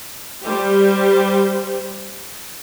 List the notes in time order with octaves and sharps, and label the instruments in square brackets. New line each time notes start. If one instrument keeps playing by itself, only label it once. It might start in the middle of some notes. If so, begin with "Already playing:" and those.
[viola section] G3 G4 C5